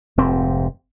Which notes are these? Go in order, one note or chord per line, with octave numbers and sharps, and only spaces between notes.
F1 G#2 C4